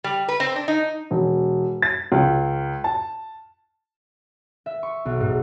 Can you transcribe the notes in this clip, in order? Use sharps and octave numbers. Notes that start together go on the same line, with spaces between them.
G3
B4
C4
D4
D#4
E1
A6
C#2
A5
E5
C#6
B1
G#2